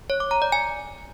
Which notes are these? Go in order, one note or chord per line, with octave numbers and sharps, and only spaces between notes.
C#5
D6
A#5
D5
G#5